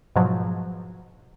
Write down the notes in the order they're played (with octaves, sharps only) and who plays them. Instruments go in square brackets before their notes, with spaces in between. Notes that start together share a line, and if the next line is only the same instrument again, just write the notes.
[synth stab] G#2 B2 F3 F#3